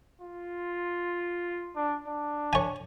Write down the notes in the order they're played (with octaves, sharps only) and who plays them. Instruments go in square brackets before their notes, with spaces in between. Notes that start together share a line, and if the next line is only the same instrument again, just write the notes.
[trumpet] F4
D4
D4
[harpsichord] C#5 G#5